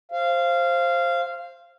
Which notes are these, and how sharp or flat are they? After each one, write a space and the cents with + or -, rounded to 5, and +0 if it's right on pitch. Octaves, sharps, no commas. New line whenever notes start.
C5 +15 F5 -15